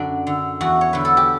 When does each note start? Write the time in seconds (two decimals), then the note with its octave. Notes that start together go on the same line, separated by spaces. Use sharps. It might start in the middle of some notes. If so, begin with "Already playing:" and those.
Already playing: F#2 D3 D4
0.27 D3
0.61 E2 F#4
0.81 C#5
0.93 D3 B4
1.05 A4
1.17 G4